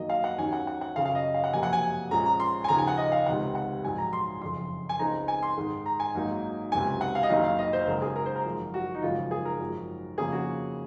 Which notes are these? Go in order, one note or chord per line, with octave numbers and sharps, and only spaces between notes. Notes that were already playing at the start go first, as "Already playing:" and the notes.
Already playing: F#2 D#3 F#3 A#3 D#5
F5
F#5
D#2 D#3 F#3 C#4 G#5
F#5
F#5
F#5
F#2 C#3 F#3 C#4 F5
F5
D#5
F5
F#5
F2 C3 F#3 A#3 G#5
F#5
G#5
A#1 A#2 F3 G#3 C#4 A#5
A#5
C6
G#5
D#2 C#3 F3 A#5
G#5
F#5
D#5
F5
C#2 C3 D#3 F#5
F#5
A#1 G#2 F#3 G#5
A#5
C6
F#1 F2 C#3 C6
G#5
C#2 C#3 G#3 C4 D#4 A#5
G#5
C6
G#2 D#3 G#3
A#5
G#5
G#1 G#2 F#3 A#3 D#4
C#2 C3 F#3 C#4 G#5
F#5
F5
D#5
F#1 F#2 D#3 A#3 D#4 F5
F5
D#5
C5
G#1 F#2 C#3 A#4
G#4
A#4
C5
A#4
G#1 F#2 F3
F#4
D#4
G#1 F#2 C#3 F3 F4
G#4
A#4
G#1 F#2 F3
F2 C#3 F3 A#3 C#4 G#4
F#4